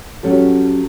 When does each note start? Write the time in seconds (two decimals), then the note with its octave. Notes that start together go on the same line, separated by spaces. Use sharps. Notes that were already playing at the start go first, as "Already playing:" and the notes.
0.23 F#3 C#4 G4 A4